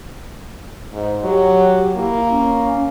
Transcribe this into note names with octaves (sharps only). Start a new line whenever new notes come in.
G#2
F#3 G4
A#3 E4
C#4